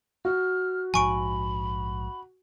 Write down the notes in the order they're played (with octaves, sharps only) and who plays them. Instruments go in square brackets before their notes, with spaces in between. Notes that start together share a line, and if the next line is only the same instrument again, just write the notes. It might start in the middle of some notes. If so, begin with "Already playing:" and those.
[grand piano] F#4 [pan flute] F6
[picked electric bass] A#1 G#2 F3 [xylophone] G#5 C#6 D7 [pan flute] B5